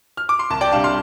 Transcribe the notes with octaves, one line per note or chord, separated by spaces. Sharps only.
F6
D6
C6
C2 A5
D5 G5
C3 G3 D4 F5 A5
C6 F6